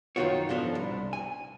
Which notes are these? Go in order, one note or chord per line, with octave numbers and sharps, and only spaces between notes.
F#2 D#3 D#4 F4 F#4 C#5
G#2 B2 F3 D4 A4
C2
G#5